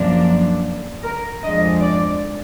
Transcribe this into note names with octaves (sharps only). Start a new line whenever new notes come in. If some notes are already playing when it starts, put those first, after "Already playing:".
Already playing: F#2 F3 A#3 D4
A#4
F2 F3 G#3 D4 D#5
D5